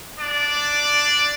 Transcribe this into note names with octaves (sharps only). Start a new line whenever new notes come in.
D4 D5